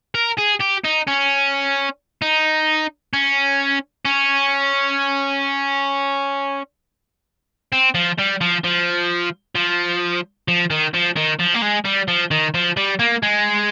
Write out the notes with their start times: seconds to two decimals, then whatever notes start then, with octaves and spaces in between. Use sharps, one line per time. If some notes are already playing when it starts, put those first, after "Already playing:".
0.15 A#4
0.38 G#4
0.61 G4
0.85 D#4
1.08 C#4
2.22 D#4
3.13 C#4
4.05 C#4
7.73 C4
7.95 F3
8.19 G3
8.41 F3
8.64 F3
9.55 F3
10.48 F3
10.70 D#3
10.94 F3
11.16 D#3
11.39 F3
11.54 A#3
11.62 G#3
11.85 G3
12.08 F3
12.31 D#3
12.54 F3
12.77 G3
12.99 A#3
13.23 G#3